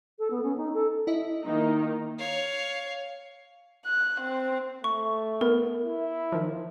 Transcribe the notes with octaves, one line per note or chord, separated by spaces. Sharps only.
A4
B3
C#4
D#4
A4
E4 D#5 E5
D#3 A#3 D#4
C#5 F5
F#6
C4
A3 C#6
B3 A#4
E4
D#3 F3